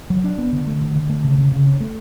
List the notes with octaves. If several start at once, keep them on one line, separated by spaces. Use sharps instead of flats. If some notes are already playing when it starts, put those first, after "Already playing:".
F#3
D4
B3
D3
A3
D3
D3
A3
C#3
C#3
C#3
C#4
A3